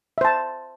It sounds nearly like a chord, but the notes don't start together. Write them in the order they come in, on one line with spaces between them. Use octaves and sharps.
E5 C5 A5